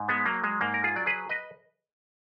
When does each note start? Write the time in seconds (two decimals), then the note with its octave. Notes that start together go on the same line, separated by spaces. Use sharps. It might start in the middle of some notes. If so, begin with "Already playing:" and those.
Already playing: G#2
0.08 G#3 B3
0.26 F#3 A#3
0.44 G#3
0.61 G#2 A#3
0.74 A#4
0.84 F4 G#4
0.96 F#3 D5
1.06 G#4 B4
1.29 B4 D#5